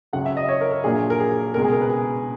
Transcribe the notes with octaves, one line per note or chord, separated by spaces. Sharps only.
C#2 C#3 F#3 F#5
E5
D#5
C#5
A#4
A#4
A#1 A#2 F#3 G#4
A#4
G#4
C#2 B2 G#3 A#4
G#4
A#4
B4
G#4